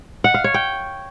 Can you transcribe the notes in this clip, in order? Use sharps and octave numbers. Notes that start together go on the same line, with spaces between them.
F#5
F5
C#5
G5